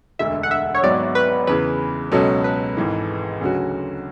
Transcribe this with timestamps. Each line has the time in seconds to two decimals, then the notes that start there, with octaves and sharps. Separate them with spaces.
0.19 E1 D2 D3 E5
0.43 F#5
0.51 E5
0.75 C#5
0.83 G#1 G#2 F#3 B3 D5
1.15 B4
1.47 E2 C#3 E3 B4
2.12 C#2 B2 F#3 C#4 A4
2.44 B4
2.77 G#1 G#2 E3
3.41 D2 C#3 F#3 C#4 F#4